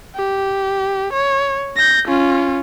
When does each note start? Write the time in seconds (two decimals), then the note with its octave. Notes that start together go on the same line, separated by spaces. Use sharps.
0.16 G4
1.13 C#5
1.76 G6 A#6
2.08 C#4 F4